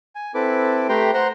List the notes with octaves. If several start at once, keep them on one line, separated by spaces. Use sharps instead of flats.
G#5
C4 E4 A4 B4 D6
A3 G4 B4 G5 A#5 C6
C5 F#5 A#5 C6